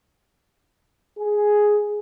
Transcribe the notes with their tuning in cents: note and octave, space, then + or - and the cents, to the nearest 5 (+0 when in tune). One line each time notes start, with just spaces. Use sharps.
G#4 +5